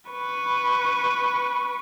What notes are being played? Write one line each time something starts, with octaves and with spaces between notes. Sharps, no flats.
B4 C#6